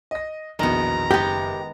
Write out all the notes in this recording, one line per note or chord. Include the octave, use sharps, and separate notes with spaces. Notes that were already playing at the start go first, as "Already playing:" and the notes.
D#5 A#6
A#1 E2 B2 D#3 B3 A#5
F#1 G#3 B3 G4